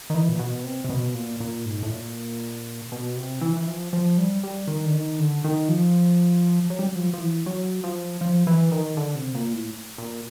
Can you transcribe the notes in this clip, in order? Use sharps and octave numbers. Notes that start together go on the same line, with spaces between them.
D#3
E3
A#2
B2
C3
C3
B2
A#2
A#2
G#2
A2
A#2
B2
C3
E3
E3
F3
F3
G3
G3
D#3
D3
D#3
D3
D#3
F3
F#3
G3
F#3
F3
F3
E3
F#3
F3
F3
E3
D#3
D3
C3
A#2
A2
A#2